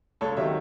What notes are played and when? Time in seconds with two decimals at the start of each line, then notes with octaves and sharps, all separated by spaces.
0.21 C#2 A4 C#5
0.36 C3 D#3 F#3 C#5 E5